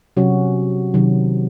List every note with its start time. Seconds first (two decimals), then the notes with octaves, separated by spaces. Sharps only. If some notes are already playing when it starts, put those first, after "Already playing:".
0.17 C3 F#3 C#4 F#4
0.94 C3 D#3 F#3